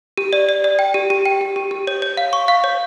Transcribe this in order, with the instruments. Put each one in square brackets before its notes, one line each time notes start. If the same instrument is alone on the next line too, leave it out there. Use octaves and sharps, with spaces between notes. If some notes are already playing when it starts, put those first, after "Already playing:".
[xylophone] G4
D5
D5
D5
G5
G4
G4
G5
G4
G4
G4
C#5
C#5
F5
C#6
F5
C#5